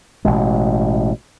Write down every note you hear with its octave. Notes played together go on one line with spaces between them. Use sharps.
A1 B2 G#3